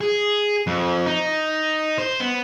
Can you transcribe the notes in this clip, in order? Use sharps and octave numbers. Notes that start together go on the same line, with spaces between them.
G#4
F2
D#4
C5
B3